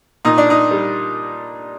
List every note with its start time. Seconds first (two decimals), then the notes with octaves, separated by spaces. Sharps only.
0.25 A#2 D#4
0.38 D4
0.50 D#4
0.71 G3